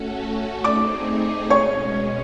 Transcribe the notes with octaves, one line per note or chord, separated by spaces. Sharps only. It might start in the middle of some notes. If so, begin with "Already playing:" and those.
Already playing: A3 C#4 F#4 A4
A3 C4 D#4 G#4 D5 D6
B2 G#3 C#4 C#5 C#6